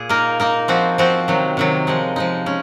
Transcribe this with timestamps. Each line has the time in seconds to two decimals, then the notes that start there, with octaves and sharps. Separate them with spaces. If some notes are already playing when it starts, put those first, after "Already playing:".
Already playing: A#2 G#4
0.09 A#3 D#4 A#4
0.40 A#3 D#4 A#4
0.68 F3 C4 F#4 C5
0.98 F3 C4 F#4 C5
1.28 C3 D#3 F#3
1.57 C3 D#3 F#3
1.87 F3 G#3 D#4
2.16 F3 G#3 D#4
2.46 G#3 C#4